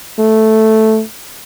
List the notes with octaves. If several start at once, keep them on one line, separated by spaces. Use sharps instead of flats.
A3